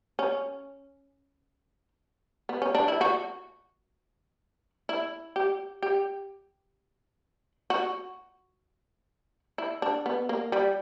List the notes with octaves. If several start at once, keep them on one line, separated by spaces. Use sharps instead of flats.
C#4
B3
C#4
D4
E4
F#4
E4
G4
G4
F#4
E4
D4
B3
A#3
G3